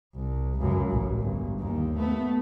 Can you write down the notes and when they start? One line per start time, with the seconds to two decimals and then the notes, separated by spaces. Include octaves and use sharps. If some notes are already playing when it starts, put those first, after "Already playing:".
0.16 C2
0.59 C#2 F#2
0.91 A1
1.20 G1
1.60 D#2
1.98 A3 B3